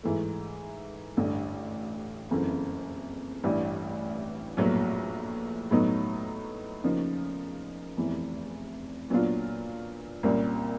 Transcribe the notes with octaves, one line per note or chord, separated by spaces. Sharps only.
G#2 E3 A3
A1 G2 D3
F#1 F2 C#3 E3 A3
A1 G2 E3 G3
A#1 A2 F#3 B3
A2 F#3 B3 D#4
E2 C#3 F3 A#3 D#4
F1 E2 C3 E3
A#2 F#3 B3 D4 F4
C2 A#2 G3 A#3 C#4